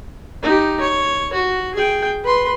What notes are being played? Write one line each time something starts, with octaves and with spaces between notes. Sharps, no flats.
D#4 G4
C#5
F#4
G#4 G5
B4 C6